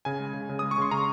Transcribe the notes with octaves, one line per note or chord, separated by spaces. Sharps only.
C#3 G#5
G#3
C#3
C#3
G#3 D#6
C#6
C#3 C6
C#3 A#5